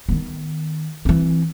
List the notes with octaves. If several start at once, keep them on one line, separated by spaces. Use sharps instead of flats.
D#3 B3
E3 C4